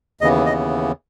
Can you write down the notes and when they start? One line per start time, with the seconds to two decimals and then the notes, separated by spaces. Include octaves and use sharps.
0.21 D#2 C#3 E3 B3 D#5
0.46 D#5